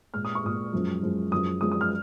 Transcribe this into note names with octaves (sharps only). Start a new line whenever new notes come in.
A#2 G#3 F6
D#6
C#6
A#2 G#3 D#6
F#2 F3 G#3
F#2 F3 G#3
F#2 F3 G#3 D#6
F#2 F3 G#3 D#6
D#6
F6